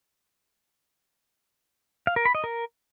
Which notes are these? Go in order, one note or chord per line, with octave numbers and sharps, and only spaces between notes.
F5
A#4
B5
D#5
A#4